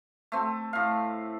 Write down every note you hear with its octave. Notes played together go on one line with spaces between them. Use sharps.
A3 C4
A2 F5